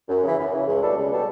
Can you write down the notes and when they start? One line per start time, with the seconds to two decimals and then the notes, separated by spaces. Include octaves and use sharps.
0.09 F#2
0.23 C#3 E3
0.38 F#2
0.52 C#3 E3
0.67 C#2
0.82 B2 G3 D4 A4
0.97 C#2
1.10 B2 G3 D4 A4